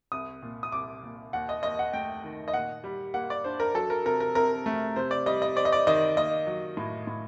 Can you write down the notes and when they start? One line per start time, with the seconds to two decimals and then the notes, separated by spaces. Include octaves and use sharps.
0.12 C2 D#6
0.42 A#2
0.63 D#6
0.72 C2 D6
1.03 A#2
1.33 D#2 F#5
1.49 D#5
1.63 D#2 D#5
1.79 F#5
1.93 A3 G5
2.24 D#3
2.48 D#5
2.53 A#2 F#5
2.84 G3
3.14 A#3 F#5
3.30 D5
3.44 D4 C5
3.60 A#4
3.74 F#3 A4
3.90 A#4
4.06 C3 A#4
4.20 A#4
4.35 C3 A#4
4.66 A3
4.96 C3 C5
5.11 D5
5.26 G3 D#5
5.42 D#5
5.56 C4 D5
5.65 D#5
5.72 D5
5.87 D#3 D#5
6.17 A#3 D#5
6.47 F#3
6.77 A2
7.07 A2